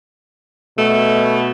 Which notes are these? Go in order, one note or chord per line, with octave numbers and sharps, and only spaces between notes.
B2 A3